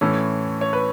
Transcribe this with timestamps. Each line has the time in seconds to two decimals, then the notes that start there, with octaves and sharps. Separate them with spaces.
0.01 A2 E3 A3 C#4 A4
0.61 C#5
0.73 B4